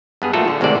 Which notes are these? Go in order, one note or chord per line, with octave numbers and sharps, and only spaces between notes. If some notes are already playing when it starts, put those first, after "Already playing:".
G2 B3 G#4
A#2 F3 A3 F4 F#4 A4
D3
G#1 A2 C3 G#3 C5 D5